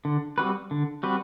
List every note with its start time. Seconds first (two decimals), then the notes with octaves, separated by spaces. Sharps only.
0.05 D3
0.38 G3 C4 F#4 B4
0.71 D3
1.03 G3 C4 F#4 B4